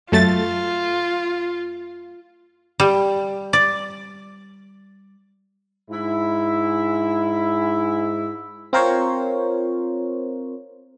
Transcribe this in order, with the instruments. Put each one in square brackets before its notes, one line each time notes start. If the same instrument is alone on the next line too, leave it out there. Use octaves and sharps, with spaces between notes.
[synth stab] F#2 A3 A6 [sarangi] F4
[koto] G3
D5
[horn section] G#2 E4
[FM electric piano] C4 F4 A#4 C5 C#5